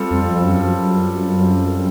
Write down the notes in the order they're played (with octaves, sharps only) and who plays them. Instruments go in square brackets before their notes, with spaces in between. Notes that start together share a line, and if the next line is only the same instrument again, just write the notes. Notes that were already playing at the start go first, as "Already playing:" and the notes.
Already playing: [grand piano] G3 C4 F4 A4
[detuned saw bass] F2
F#2